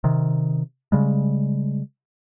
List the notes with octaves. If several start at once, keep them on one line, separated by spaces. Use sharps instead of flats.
C3 D#3
C#3 G3 G#3